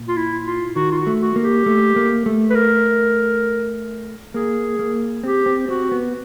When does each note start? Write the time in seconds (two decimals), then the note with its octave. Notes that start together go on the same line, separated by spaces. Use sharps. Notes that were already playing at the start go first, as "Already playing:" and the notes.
Already playing: A#2
0.08 F4
0.17 E4
0.46 F4
0.76 D#3 F#4
0.91 F4
0.98 F#4
1.07 A3
1.21 F#4
1.36 A#3
1.43 G4
1.66 A3
1.96 A#3
2.26 A3
2.50 B4
2.55 A#4
4.34 A#3 G#4
4.79 A#3
5.24 C4 G4
5.46 C4
5.68 C4 F#4
5.92 B3